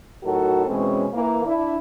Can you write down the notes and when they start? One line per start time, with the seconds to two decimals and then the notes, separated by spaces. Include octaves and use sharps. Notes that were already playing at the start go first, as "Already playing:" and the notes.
0.24 A2 F#3 D#4 F#4 A4 A#4
0.67 B2 E3 G#3 C4 C#4
1.14 E3 A#3
1.44 D4 E4